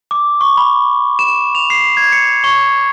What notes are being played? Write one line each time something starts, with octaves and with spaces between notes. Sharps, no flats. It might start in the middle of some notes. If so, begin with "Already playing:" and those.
D6
C#6
B5
E7
F7
C7
G#6
C#7
C#6